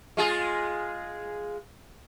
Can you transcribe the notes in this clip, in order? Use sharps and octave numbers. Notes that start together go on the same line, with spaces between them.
G#3 F4 G#4